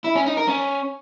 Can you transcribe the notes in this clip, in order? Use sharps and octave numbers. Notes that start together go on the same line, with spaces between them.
E4
C#4
D#4
A#4
C#4